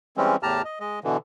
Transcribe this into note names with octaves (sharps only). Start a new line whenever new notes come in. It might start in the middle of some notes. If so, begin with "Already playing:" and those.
E3 G3 G#3 C4 C#4
E2 A2 G4 A5 A#5 F6
D#5
G#3 D#5
B2 D3 E3